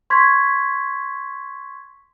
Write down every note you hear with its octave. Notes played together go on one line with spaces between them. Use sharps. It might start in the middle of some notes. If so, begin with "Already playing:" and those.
C6 C#6 G#6 B6